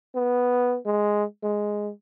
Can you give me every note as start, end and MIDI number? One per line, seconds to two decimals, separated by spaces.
0.15 0.77 59
0.86 1.24 56
1.43 1.91 56